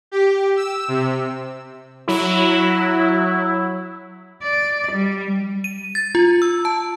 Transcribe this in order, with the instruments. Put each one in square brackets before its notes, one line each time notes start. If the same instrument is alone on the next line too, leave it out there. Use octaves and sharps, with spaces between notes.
[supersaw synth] G4
E6
C3
[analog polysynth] F#3 E4
[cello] D5
G3
[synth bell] D#7
A6
F4
E6
A5